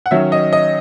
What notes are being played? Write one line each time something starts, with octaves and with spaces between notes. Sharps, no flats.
F#5
D#3 F#3 C#4 E5
D#5
D#5